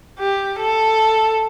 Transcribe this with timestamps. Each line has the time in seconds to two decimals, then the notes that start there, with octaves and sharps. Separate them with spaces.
0.19 G4
0.59 A4